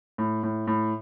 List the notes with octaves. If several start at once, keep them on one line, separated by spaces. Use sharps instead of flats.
A2
A2
A2